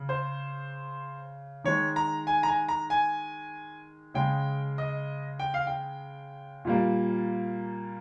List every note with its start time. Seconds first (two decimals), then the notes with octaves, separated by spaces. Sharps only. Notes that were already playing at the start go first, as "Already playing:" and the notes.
Already playing: C#3
0.09 C5
1.64 D#3 G#3 C#5
1.96 A#5
2.27 G#5
2.43 A#5
2.48 G#5
2.69 A#5
2.90 G#5
4.14 C#3 G#3 G5
4.78 D#5
5.39 G5
5.54 F5
5.67 G5
6.65 A#2 G3 A#3